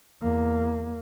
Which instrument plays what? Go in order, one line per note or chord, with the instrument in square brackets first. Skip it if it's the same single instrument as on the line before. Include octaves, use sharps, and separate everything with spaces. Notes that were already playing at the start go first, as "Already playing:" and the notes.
[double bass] E2 A#3